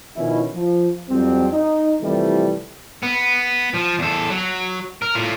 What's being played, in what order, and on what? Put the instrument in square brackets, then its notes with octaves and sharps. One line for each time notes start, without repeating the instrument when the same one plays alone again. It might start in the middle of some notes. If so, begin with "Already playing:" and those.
[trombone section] B2 D#3 F3 C#4 E4
F3
F2 F#3 G3 C4
D#4
C3 E3 F3 G3 A3 E4
[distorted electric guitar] B3
F3
E2 A4
F#3
A#4
A2 F4